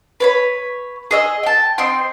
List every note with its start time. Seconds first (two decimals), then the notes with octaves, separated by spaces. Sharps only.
0.20 B4 C#5 B5
1.11 G#4 D#5 E6
1.43 G5 A5
1.78 C4 D#5 G5 C6